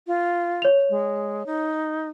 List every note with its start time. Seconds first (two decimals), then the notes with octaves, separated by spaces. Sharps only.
0.07 F4
0.62 C#5 F7
0.90 G#3
1.46 D#4